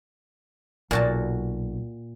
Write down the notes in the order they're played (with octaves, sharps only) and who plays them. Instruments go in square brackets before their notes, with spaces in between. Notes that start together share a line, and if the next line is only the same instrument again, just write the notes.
[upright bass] B1 [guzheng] A#2 F#4 A5